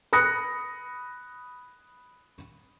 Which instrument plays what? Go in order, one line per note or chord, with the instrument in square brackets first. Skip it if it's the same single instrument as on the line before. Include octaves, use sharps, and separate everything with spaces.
[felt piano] B5 D#6 F#6 A#6 C#7